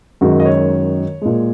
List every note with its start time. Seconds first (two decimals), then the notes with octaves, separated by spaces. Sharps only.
0.21 F#2 D#3 G#3 F#4
0.40 D#5
0.46 C#5
1.22 A#2 G#3